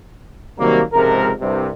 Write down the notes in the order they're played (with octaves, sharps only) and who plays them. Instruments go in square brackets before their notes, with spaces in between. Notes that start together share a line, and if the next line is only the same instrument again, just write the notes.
[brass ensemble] C3 D#3 F#3 G3 A#3
C#2 G#2 C3 F3 A#4
C2 G2 C3